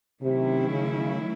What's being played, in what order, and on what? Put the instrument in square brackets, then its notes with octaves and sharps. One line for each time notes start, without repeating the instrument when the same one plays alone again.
[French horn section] C3 [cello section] D#3 F#3 A3 C#4 E4
[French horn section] C#3